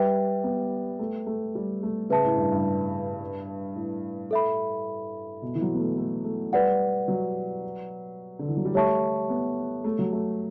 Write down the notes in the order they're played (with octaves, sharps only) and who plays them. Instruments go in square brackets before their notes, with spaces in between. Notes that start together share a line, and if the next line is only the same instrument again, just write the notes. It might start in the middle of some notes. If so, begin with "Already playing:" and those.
Already playing: [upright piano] G3 [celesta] B4 E5 G5
[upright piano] B3
A3
A3
G3
A3
[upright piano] C#3 [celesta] B4 E5 A5
[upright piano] A2
G2
G2
A2
[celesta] A4 E5 B5
[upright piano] B2
E3
F#3
B3
A3
A3
A3
[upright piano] G3 [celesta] B4 D5 F#5
[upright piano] F#3
D3
E3
F#3
G3
[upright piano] A3 [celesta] G4 C#5 E5 A5 C#6
[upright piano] B3
A3
F#3
A3